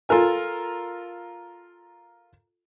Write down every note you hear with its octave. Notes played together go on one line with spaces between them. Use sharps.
F4 A4 A#4 G#5